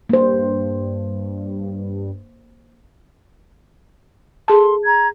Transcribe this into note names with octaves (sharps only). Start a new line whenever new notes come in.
G2 A#3 C5
G#4 A4 A5 C6
A#5 G#6